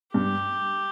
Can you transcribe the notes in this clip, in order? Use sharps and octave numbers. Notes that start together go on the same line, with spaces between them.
G2 G4